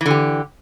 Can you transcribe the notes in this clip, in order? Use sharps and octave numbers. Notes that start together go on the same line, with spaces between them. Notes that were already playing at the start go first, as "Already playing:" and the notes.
D3 E3 G4